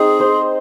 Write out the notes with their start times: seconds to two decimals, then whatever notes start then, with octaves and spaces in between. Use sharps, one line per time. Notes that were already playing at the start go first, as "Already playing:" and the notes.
Already playing: C4 D#4 G#4
0.20 C5